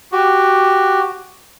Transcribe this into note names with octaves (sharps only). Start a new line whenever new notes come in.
F#4 G4